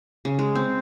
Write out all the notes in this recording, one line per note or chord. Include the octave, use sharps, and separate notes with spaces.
C#3
G#3
C4